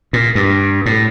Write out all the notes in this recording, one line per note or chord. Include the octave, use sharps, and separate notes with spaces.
A#2
G2
A2